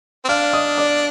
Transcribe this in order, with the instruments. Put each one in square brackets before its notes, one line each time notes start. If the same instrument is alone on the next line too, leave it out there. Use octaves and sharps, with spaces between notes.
[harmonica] C4
[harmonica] D4 [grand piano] F5 F6
[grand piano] D#5 D#6
D5 D6